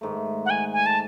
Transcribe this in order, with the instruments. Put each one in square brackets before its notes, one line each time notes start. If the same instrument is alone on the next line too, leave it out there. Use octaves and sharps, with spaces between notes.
[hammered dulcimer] G#2 D#3 A3
[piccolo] F#5
G#5
G#5
A5